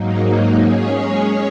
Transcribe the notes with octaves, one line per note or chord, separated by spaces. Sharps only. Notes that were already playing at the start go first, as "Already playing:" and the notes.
Already playing: G#2 F#3 A#3 D#4
G#3 C#4 G#4 C#5